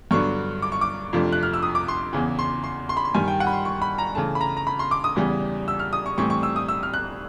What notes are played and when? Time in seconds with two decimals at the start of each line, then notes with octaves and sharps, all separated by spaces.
0.11 G2 D3 F#3 B3 D4 C#6
0.62 D6
0.72 C#6
0.81 D6
1.13 F2 C3 F3 A3 D4
1.32 F#6
1.43 F6
1.53 E6
1.63 D#6
1.75 D6
1.88 C6
2.13 E2 C#3 E3
2.39 C6
2.64 C6
2.89 C6
2.97 B5
3.05 C6
3.14 G2 D#3 G3 G#5
3.28 G5
3.40 F#5
3.47 B5
3.53 C6
3.65 C#6
3.82 B5
3.98 A#5
4.15 C#3 E3 A3 A5
4.35 B5
4.41 A#5
4.57 A#5
4.67 B5
4.79 C6
4.91 D6
5.04 D#6
5.16 E2 C#3 E3 G3
5.68 E6
5.79 F6
5.93 D#6
6.06 C#6
6.18 A2 E3 G3 C4 C#6
6.30 C#6
6.43 E6
6.56 D#6
6.68 E6
6.83 F6
6.94 F#6